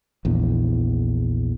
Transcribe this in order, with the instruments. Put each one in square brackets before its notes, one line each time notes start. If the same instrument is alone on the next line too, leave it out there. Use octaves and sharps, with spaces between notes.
[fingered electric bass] A#1 E2